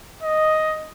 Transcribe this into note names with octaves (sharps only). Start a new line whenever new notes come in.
D#5